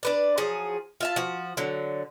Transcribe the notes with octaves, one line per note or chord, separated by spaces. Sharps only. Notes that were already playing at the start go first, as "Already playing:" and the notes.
D4 B4 D5
F3 F#3 G#4
F4 E5 A5
F3 F#4
D3 F#3